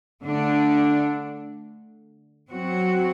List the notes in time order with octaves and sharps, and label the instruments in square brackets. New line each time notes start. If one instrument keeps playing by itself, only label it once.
[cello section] D3 A3 D4
F#3 C4 F#4